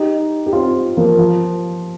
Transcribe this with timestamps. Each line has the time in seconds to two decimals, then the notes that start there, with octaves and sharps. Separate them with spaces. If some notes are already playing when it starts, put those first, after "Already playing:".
Already playing: D#4 G4
0.46 G4
0.53 C4 F4
0.97 F3 A#3
1.18 F3